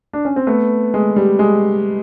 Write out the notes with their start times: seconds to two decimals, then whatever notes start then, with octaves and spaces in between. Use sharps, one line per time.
0.13 D4
0.25 C#4
0.36 C4
0.47 A3 B3
0.94 G#3
1.16 G3
1.39 G#3